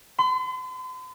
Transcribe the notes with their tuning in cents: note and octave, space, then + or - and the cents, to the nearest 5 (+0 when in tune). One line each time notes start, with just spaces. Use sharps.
C6 -45